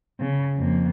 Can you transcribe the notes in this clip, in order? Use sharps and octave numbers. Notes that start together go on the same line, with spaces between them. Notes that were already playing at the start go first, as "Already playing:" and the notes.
C#3
F2 A#3